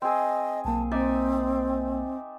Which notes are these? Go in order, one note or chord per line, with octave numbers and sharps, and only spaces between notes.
C4 G#4 D#5
B1 A#3 A5
C4 D#4 D5 E5